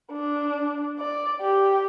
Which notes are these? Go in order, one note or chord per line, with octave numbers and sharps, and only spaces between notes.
D4
D5
G4